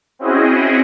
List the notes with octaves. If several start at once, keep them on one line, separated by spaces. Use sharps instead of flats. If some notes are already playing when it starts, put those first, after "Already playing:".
C4 C#4 E4 F#4 G#4 D#5